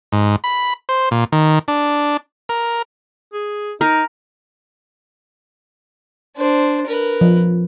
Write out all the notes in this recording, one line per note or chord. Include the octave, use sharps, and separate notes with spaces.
G#2
B5
C5
A#2
D#3
D4
A#4
G#4
D#4 A#4
D4 C5
A#4 B4
F3